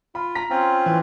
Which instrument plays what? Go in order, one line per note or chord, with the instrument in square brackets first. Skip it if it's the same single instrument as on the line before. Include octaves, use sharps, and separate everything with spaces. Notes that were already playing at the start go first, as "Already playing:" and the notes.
[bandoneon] F4 [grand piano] B5
[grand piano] A#5 B6
[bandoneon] C4 C#4 F4
[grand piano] E3